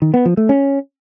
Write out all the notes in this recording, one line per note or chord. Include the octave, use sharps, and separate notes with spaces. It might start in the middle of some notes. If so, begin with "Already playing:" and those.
D#3
B3
F3
A3
C#4